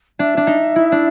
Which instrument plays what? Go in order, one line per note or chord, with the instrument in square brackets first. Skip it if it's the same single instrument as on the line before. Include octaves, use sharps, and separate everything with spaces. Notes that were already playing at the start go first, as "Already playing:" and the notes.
[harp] D4 [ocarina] E5
[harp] D4
D#4
E4
D4